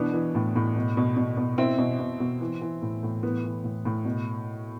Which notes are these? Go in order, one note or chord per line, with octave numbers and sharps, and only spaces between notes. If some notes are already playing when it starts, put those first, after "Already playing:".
Already playing: B2 E3 B3 D4
E3
A2
A2
B2
B2
B2
B2
B2 C4 E4
B2
B2
B2
E3
E3
A2
A2
E3 B3
E3
A2
A2
B2